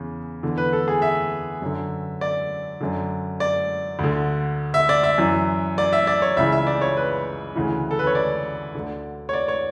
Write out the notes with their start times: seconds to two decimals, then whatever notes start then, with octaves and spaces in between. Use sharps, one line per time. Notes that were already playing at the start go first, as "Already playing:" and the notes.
Already playing: E2 C#3
0.43 E2 D3
0.58 B4
0.73 A4
0.88 G#4
1.02 E5
1.62 F#2 D3
2.21 D5
2.80 F#2 D3
3.40 D5
3.99 D2 D3
4.74 E5
4.89 D5
5.04 E5
5.18 F#2 E3
5.78 D5
5.93 E5
6.07 D5
6.22 C#5
6.37 C#2 C#3 E3 E5
6.52 E5
6.67 D5
6.81 C#5
6.97 B4
7.55 D2 C#3 E3
7.91 A4
7.99 B4
8.07 C#5
8.15 D5
8.75 D2 D3
9.29 C#5
9.33 D5
9.48 C#5